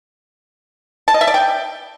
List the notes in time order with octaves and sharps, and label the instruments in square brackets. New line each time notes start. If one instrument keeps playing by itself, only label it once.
[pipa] A5
D#5
E5
D5
G5